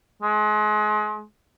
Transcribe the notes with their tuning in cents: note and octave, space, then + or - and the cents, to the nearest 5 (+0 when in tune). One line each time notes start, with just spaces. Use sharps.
G#3 +35